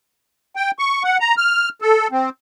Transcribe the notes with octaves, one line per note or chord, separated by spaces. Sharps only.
G5
C#6
F#5
A#5
F6
A4
C4